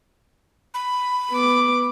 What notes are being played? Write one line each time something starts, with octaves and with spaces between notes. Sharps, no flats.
B5
B3 D6